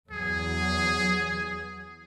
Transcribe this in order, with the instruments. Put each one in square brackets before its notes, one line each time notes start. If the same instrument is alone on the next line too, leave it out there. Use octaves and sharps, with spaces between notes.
[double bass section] E2 E3 F#3 [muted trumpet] G#4